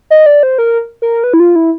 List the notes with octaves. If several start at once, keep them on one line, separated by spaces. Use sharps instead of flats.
D#5
D5
C5
A#4
A#4
B4
E4
F4
E4